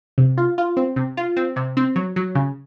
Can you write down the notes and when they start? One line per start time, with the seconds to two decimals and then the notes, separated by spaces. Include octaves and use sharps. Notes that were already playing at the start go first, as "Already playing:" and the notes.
0.18 C3
0.37 F4
0.58 F4
0.77 C4
0.96 C3
1.17 F4
1.37 C4
1.56 C3
1.77 C4
1.96 F#3
2.16 F#3
2.35 C#3